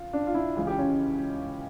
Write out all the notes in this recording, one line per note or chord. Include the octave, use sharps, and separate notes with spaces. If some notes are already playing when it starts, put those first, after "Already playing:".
Already playing: F4
D4
F4
E4
C#2 C#3 E3 F4
G4
C#4